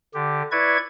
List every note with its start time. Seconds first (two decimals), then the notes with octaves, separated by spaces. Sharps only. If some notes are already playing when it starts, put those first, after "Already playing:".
0.14 D3 G4
0.51 E4 B4 D5 C#6 G#6